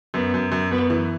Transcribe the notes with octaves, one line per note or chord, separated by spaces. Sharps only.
F#2 B3
F#2
F#2
F#2 B3
E3